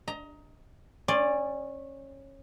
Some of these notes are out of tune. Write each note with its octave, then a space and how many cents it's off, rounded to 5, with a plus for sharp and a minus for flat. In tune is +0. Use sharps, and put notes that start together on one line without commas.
D#5 +25 A#5 +0
C#4 -20 D5 +5 C6 +0